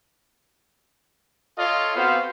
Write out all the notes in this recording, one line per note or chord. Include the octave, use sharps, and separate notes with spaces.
F4 A4 C#5 D#5 F5
B3 C4 F4 F#4 C5 F5